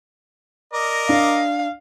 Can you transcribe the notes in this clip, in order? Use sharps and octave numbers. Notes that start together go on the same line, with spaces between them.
A#4 D5 D#5
D4 F5